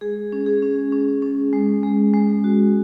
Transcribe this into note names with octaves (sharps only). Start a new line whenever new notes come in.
G#3 G#4
C#4
G#4
C#4
C#4
C#4
G#3
G#3
G#3
F#4